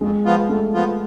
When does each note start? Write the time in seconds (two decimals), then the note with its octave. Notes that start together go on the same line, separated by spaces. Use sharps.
0.01 F2 G#3
0.25 F3 B3 F4
0.49 F2 A3
0.74 F3 B3 F4